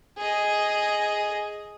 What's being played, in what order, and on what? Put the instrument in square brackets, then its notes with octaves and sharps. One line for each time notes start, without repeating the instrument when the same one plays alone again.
[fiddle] G#4 D#5